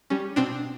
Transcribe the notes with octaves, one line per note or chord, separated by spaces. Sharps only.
G3 C#4
B2 C4 D4